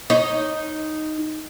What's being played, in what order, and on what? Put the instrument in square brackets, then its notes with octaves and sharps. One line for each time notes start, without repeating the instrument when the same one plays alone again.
[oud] D#4 C#5